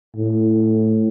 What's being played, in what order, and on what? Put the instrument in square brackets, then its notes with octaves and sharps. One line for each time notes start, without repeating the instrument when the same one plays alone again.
[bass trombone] A2